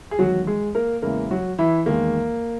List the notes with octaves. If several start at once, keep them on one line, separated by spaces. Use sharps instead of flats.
G#4
E2 D#3 F#3 G#3 F#4
G#3 G#4
A#3 A#4
E2 C#3 E3 G#3 A#3 A#4
F#3 F#4
E3 E4
E2 D#3 G#3 A#3